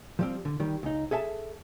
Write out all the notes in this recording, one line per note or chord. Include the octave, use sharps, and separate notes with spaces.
F3 G3 C4
D3
D#3 G3
C#2 D#4
G#4 A4 E5 G5 A5